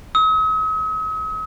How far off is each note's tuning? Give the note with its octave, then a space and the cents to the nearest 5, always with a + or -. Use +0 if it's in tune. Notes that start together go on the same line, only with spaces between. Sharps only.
D#6 +45